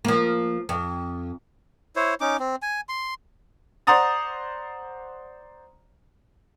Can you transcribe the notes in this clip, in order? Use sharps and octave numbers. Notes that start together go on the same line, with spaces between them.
F3 A#3
F2
E4 C5 C#5
C#4 D#4 D6
C4
G#5
C6
C5 D5 F#5 A#5 D#6 A6